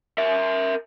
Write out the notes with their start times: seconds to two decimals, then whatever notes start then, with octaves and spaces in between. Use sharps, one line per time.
0.18 A#4 E5